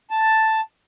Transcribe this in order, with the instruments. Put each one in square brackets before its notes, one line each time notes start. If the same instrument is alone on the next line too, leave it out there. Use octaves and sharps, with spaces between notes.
[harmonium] A5